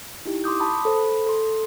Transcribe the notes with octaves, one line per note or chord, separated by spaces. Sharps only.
D#4 E4 G4
C6 D6 D#6 G6
A5 B5 D#6
A4 C5 B5
A4 C6